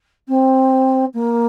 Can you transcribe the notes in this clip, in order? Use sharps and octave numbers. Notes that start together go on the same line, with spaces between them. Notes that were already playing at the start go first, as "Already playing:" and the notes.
C4
A#3